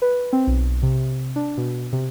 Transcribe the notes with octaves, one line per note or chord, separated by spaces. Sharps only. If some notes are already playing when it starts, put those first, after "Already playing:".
B4
C4
B1
C3
D4
B2
C3